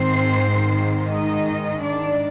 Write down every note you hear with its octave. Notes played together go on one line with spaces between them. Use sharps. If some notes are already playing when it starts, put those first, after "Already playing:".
Already playing: G#2 D#3 C4 C5
D#4 D#5
D4 D5